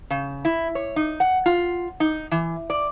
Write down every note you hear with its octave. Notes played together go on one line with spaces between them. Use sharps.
C#3
E4
C#5
D#4
F#5
F4
D#4
E3
D5